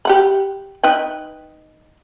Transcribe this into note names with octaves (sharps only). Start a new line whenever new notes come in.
G4 F#5 B5
D#4 B4 G5